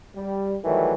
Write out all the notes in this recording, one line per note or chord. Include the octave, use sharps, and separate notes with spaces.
G3
D#3 E3 F#3 G3 A3